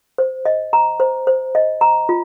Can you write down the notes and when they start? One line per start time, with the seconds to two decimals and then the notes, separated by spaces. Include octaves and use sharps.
0.18 C5
0.45 D#5
0.73 A#5
1.00 C5
1.27 C5
1.55 D#5
1.81 A#5
2.09 F4